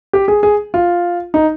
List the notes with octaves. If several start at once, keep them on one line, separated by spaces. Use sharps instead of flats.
G4
G#4
G#4
F4
D#4